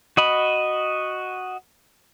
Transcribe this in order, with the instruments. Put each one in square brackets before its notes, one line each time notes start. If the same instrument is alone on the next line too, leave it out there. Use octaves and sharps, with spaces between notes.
[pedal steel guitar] F#4 D#5 B5